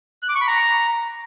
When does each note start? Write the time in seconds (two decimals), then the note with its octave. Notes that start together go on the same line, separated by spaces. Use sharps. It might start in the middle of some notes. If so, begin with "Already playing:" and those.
0.23 F#6
0.29 D6
0.35 C#6
0.41 B5
0.47 A#5